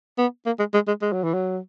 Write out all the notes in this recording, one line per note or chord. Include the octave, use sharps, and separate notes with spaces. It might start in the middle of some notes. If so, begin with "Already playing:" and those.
B3
A#3
G#3
G#3
G#3
G#3
F#3
E3
F#3